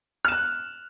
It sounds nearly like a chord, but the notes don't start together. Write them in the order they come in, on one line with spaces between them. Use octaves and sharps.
F6 E7 F#6